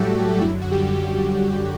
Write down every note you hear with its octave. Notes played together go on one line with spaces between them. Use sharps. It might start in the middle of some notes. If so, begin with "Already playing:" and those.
Already playing: A2 F#3 G3 A3 F#4 G4 A4
F#2 D3 F#3 E4
F#4
G3 G4